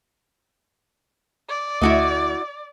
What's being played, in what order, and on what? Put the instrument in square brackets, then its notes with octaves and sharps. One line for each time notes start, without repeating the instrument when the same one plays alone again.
[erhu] D5
[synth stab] D2 A3 [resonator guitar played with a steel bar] E4 F#4 D#5